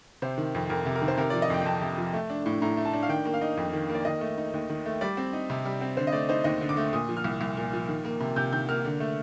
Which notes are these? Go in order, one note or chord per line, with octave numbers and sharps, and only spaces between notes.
C3 C5
D#3
F2
F2 A#4
C3
A#4
D#3
C5
C3 A#4
F3 D5
D#5
F2 G5
G5
F2 A5
C3
F3
A3
D4
A2
A2 A#5
A3
A5
D4
F5
D#3 G5
A#3
F5
D#4
F2
D#3
A#3
D5
D#3 D#5
A3
D#4
D#2
D#3
A3
G3 D5
C4
D#4
C3
G3
C4
D3 C5
D#5
A3 D5
D#4 C5
D#2 D#5
D3
D6
A3
A#2 D#6
F3
F6
C2
C2
A#2
F3
D#3
A#3
C3
C3 G6
D#3 G6
A#3 F6
D3
A3